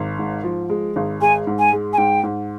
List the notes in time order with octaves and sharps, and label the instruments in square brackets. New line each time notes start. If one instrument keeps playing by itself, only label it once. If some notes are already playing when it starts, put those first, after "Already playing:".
Already playing: [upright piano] G#1
G#2
F3
G#3
G#1
[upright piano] G#3 [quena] G#5
[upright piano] G#2
[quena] G#5
[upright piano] G#3
[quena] G#5
[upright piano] G#2 [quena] G5
[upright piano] G#2